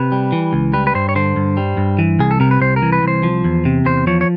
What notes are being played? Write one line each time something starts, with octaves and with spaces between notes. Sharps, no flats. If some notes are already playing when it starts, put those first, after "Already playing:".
Already playing: C3 B4
G3
E3
C#2
G3 B4
B4
G2 C5
C#5
D3 C5
G2
G3
G2
E3
C2 G#4
A4
C3 A#4
B4
C2 C5
A#4
E3
B4
C2 C5
F3
E2
C3
E2 C5
F3 C#5
C#5